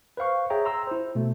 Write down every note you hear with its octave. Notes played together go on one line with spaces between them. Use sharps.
B4 C5 F5 C#6
G#4 C#5 E5 G5 A#5
A#5 C6 E6
E4 C5
B2 A3